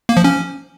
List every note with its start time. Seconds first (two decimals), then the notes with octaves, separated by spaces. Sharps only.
0.09 A#3
0.17 F3
0.24 C#4